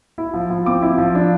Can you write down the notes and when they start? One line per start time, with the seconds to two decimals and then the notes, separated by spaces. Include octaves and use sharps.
0.18 E4
0.34 F3
0.50 F3
0.66 C4 D6
0.82 E4
0.98 F3
1.15 D4